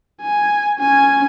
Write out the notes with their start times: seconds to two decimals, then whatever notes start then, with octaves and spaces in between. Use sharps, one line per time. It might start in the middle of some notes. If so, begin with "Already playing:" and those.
0.22 G#5
0.79 C#4 G#5